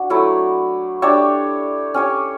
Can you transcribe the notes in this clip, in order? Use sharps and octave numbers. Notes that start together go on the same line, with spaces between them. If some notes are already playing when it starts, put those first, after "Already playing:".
Already playing: D4 F#4
F#3 A3 E4
D4 G4 C#5 E5
C#4 G4 C#5